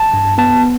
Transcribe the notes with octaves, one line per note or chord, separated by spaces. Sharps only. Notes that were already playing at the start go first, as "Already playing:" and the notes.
Already playing: A5
G2
B3 A5